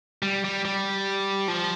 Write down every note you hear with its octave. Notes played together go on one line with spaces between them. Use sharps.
G3
G3
G3
F3